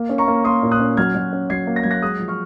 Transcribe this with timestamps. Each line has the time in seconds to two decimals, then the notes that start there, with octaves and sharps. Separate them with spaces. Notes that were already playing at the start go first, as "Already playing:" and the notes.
Already playing: A#3
0.09 C#4
0.18 A#5 C#6
0.28 A#3
0.44 A#3 C6 D#6
0.63 A#2
0.71 D#6 F#6
0.80 C#4
0.97 F#3 F6 G#6
1.14 F#3
1.33 C#4
1.50 F#3 G#6 C7
1.67 A#3
1.76 A#6
1.83 F#3 G#6
1.91 F#6 A#6
2.02 G#3 D#6 F#6
2.20 F3
2.28 C#6 F6